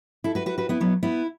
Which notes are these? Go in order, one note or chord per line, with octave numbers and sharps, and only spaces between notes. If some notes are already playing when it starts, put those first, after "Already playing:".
E4 A4
F#4 B4
F#4 B4
F#4 B4
B3 E4
F#3 B3
B3 E4